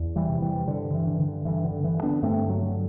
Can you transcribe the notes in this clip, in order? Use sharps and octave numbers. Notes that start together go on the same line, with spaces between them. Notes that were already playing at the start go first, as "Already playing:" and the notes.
Already playing: E2
E3 G3
C3
E3 G3
G2 D3
E3
D3
D3
G2 E3
D3
D3 E3
B3 D4
G2 A3 C4
F#3 A3
D3